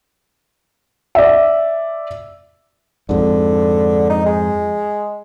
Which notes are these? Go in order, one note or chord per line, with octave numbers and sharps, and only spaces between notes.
D5 E5
F2 G#2 D3
D#4
G#3